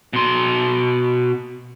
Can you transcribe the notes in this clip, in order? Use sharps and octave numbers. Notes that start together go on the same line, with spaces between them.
B2 C6